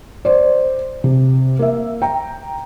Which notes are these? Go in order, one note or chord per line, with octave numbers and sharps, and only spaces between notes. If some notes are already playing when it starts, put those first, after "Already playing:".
C5 D5
C3
A#3 E5
G5 A#5